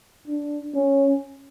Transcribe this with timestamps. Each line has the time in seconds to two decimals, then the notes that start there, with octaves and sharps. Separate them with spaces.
0.28 D4
0.75 C#4